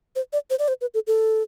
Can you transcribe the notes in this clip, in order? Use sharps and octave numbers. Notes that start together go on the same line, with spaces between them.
C5
D5
C5
D5
C5
B4
A4
A4